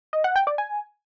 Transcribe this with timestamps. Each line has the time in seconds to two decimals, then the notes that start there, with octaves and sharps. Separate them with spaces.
0.13 D#5
0.24 F#5
0.36 G5
0.47 D5
0.58 G#5